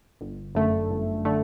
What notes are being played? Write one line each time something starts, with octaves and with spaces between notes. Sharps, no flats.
G1
F#2 D3 A3
G1
D3 A3